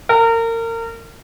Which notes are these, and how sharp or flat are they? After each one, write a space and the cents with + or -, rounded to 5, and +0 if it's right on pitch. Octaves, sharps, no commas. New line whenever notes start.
A#4 -30